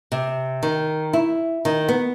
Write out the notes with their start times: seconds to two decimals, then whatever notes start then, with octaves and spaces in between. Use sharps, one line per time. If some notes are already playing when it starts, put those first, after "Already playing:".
0.12 C3
0.63 D#3
1.13 E4
1.65 D#3
1.89 B3